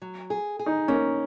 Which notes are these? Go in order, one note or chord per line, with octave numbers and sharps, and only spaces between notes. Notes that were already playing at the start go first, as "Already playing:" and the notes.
F#3
G#4
G#4
D#4
A#3 C#4